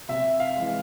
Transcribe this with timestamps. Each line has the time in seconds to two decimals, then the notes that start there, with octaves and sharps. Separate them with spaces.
0.09 C3 E5
0.40 F5
0.56 E3 G#3